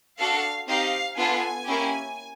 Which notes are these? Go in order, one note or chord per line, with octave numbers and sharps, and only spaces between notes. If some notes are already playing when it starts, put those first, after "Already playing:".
D4 F#4 A4 F5
C4 D#4 G4 F5
B3 D4 F4 A4 G#5
A#3 C#4 E4 G4